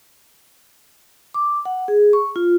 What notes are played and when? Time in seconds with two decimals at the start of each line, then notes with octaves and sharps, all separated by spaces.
1.34 D6
1.65 F#5
1.88 G#4
2.13 C#6
2.36 F4